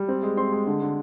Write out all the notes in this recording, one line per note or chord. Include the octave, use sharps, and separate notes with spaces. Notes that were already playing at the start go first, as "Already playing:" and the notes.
Already playing: G3
C4
G#3
C4 C6
G#3
D3
D3